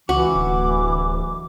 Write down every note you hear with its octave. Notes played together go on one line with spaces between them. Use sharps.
C#2 E3 F#4 D6
D1